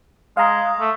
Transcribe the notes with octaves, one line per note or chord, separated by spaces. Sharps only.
G#3 F5 A#5
A3